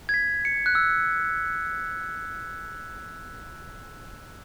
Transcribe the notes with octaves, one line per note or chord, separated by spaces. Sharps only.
G#6
B6
C#7
F#6
E6